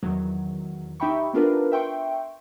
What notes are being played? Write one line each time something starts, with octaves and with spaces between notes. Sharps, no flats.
E2 D#3 F#3
D#4 G4 E5 G5 B5 C#6
B3 D4 F4 A#4 B4
E5 G5 C6 C#6